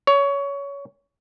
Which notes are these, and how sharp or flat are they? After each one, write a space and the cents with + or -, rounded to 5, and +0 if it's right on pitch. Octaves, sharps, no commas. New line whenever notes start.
C#5 +20